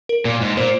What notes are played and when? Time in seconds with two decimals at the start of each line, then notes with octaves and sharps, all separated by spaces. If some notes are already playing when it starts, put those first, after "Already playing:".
0.09 A#4
0.25 A#2
0.41 G#2
0.57 A#2 C5